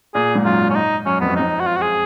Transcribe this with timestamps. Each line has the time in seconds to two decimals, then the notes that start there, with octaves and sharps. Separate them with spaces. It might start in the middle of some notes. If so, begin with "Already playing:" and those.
0.14 A#2 G#4
0.35 G#2
0.45 F#2 F4
0.70 C#4
0.75 D#4
1.06 F#2 C#4
1.21 F2 B3
1.30 F#2
1.36 F2 D#4
1.60 F#4
1.67 F4
1.76 F#4
1.82 G#4